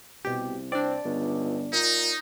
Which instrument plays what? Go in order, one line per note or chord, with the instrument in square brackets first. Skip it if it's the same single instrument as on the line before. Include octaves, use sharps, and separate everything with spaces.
[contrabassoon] C2 [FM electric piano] B2 G4
[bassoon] C4 [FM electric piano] D4 D5
[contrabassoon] G1 [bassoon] C#2
[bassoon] A#2 [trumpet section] D#4